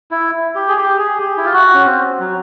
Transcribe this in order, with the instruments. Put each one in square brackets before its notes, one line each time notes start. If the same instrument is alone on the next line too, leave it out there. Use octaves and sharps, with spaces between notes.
[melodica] E4
G4
G#4
G4
G#4
G4
E4
F4
F#4
C#4
C4
F#3